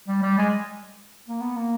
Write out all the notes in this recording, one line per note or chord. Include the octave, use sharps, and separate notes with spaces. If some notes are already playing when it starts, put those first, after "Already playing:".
G3
G3
G#3
A#3
B3
A#3